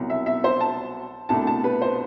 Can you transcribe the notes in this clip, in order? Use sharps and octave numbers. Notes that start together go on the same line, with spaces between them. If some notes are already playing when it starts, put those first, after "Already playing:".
Already playing: C2 B2 F#3
E5
E5
C5
A5
C2 B2 A3 D4 A5
A5
B4
C5